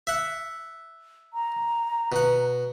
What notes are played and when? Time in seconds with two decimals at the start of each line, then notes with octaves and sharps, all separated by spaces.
0.07 E5 F#5
1.34 A#5
2.12 B2 F#5